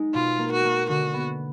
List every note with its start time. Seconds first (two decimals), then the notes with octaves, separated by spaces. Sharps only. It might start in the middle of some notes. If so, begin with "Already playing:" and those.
Already playing: G#3 D#4
0.14 B2 F4
0.39 A#3
0.52 F#4
0.65 A#3
0.89 D3 F#4
1.13 B3